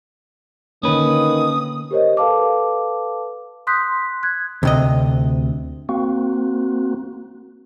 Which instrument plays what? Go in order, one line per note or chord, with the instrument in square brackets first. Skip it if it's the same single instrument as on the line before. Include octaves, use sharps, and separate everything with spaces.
[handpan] D3 A#3 [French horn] D#3 [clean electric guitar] C#4 B4 [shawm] D#6
[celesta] G4 A#4 C5 C#5 D#5
A4 B4 F5 A5 D6
C6 D#6 F#6 G6 B6
F#6 G#6
[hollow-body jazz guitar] D2 C3 D#5
[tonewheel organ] A#3 C4 F#4